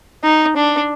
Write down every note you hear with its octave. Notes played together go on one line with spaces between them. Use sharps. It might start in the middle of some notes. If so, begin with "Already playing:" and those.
D#4
D4